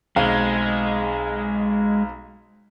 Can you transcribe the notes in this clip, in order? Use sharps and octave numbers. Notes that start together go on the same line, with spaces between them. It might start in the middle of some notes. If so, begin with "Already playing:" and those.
B1 G#3 C4 F5